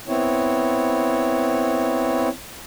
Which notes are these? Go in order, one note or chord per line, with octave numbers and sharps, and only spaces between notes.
B3 C4 E4 C#5